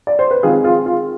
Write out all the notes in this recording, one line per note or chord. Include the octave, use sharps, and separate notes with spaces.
D5
C5
B4
D#3 G#3 C4 F4 G#4
F4 G#4
F4